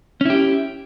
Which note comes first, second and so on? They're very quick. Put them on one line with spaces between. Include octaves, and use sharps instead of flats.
C#4 E4 G4